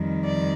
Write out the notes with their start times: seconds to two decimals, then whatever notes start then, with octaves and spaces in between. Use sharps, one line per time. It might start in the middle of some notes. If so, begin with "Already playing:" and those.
Already playing: F2 D#3 G3
0.24 D5